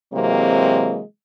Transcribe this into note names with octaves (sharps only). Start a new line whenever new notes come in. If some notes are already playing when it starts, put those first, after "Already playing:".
C3 E3 F#3 G#3 A#3 C4